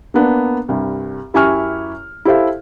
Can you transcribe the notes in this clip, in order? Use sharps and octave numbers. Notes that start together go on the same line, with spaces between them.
A#3 B3 D4
C2 G2
F#2 E4 G4 G#5 C#6 F6
E4 G4 A4 C5 E5 F5